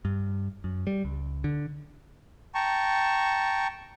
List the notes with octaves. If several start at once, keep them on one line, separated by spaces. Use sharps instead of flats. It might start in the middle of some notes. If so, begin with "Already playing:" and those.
G2
F#2
G3
C#2
D3
G5 A5 A#5 C#6